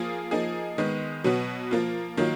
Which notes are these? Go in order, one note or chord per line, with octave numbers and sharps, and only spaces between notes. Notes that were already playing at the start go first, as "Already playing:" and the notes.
Already playing: F3 A#3 F4 G#4
F3 A#3 D#4 G#4
D#3 G#3 B3
B2 F#3 B3 F#4
F3 A#3 F4
D#3 F#3 A#3 F4